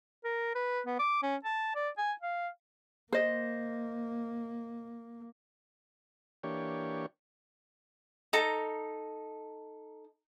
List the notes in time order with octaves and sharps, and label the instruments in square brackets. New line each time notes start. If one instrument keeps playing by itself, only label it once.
[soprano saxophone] A#4
B4
B3
D6
C#4
A5
D5
G#5
F5
[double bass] A#3 [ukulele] C5 D#5
[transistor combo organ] E3 A#3 D4 G4 C#5
[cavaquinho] D#4 A4 A#5